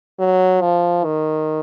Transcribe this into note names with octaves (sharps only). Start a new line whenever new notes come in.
F#3
F3
D#3